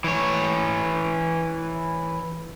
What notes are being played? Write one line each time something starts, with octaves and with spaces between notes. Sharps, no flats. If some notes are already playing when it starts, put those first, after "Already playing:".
E3 C#5